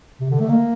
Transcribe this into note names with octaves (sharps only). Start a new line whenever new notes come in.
C3
D3
A3
A#3